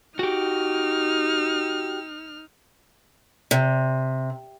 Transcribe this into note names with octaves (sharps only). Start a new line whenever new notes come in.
D#4 F#4 G4 F6
C3